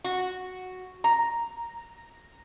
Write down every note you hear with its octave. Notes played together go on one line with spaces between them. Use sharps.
F#4
A#5